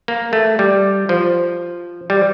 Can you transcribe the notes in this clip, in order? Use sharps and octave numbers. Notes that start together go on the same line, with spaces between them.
A#3
A3
G3
F3
G3